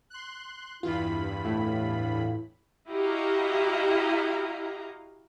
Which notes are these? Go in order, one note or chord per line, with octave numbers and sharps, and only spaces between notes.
C6 F#6
E2 G2 E4 F4 B5
A2 E4 F4
E4 F#4 G4 D#5 F5 A#5